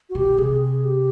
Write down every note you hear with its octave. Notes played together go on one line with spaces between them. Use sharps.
F#4
B2 G4
C3 G#4
G#4
G4